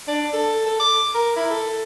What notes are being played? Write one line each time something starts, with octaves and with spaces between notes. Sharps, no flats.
D4
A4
A4
D6
A#4
E4
A4